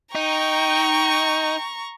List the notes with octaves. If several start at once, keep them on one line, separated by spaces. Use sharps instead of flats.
D#4 G5 A#5 C#6